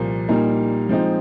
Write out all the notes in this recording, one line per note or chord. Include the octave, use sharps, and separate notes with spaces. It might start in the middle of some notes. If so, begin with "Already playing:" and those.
Already playing: C2 A#2 F3 A#3
A#2 G3 A#3 D#4
F3 G#3 C4 D#4